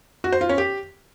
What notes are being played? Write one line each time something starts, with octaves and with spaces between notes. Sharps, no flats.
F#4
C5
F4
C#4
G4